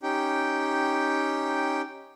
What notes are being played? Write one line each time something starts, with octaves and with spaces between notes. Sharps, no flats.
C#4 D#4 G4 G5